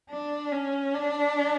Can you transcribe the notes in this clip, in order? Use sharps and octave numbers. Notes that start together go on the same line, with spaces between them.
D4
C#4
D4